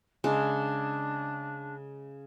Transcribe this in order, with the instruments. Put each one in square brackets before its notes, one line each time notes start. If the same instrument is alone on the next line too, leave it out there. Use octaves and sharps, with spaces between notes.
[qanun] C#3 G#3 [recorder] D4